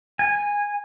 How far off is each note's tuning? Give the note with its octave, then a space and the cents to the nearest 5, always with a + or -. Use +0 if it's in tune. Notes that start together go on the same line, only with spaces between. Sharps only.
G#5 -15